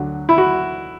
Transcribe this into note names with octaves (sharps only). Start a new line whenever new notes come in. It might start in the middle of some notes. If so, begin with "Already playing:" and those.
Already playing: D2 D3 F#3
E4
F#4